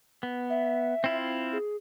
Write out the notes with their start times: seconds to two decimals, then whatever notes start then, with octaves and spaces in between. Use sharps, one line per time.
0.23 B3
0.50 E5
1.04 C4 E4 F4
1.53 G#4